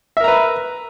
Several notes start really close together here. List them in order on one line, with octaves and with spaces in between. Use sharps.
E5 A#4 A#5 B4